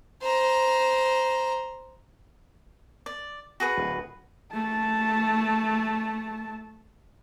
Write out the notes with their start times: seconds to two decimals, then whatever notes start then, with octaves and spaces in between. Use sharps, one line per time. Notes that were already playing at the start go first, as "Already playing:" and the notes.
0.22 C5 A#5
3.06 D5
3.60 F#4 G#4 B4
3.78 D1
4.53 A3 A5